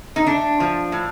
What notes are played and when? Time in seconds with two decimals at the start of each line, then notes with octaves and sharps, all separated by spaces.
0.16 D#4
0.27 A3 D4
0.60 F3
0.92 A2